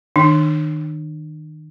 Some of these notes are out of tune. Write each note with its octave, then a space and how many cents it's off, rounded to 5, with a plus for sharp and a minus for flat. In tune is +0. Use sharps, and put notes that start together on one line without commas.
D#3 +0 D4 +40